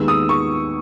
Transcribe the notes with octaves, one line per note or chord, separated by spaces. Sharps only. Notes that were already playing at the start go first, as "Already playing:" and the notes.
Already playing: D#2 D#3 G#3 B3 E6
D#6
C#6